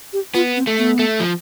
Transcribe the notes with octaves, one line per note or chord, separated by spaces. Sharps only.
G4
B3 F4
C4
A3
B3
A3
F3